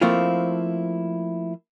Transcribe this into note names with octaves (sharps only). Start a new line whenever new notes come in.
F3 A3 A#3 C4 E4 F4